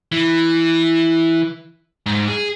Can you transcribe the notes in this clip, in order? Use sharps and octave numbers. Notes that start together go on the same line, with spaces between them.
E3
G#2
G#4